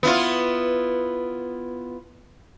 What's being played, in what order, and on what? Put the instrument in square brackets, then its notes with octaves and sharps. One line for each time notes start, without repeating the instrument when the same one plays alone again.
[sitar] B3 E4 F4